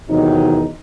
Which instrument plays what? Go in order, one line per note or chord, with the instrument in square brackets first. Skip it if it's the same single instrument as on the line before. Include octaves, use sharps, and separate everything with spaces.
[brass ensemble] E2 C3 D#3 F#3 D#4